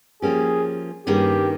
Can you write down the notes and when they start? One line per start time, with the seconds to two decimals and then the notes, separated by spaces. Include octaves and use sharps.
0.22 F3 A#3 C#4 G4 G#4
1.06 G2 D#3 A#3 C#4 G4 G#4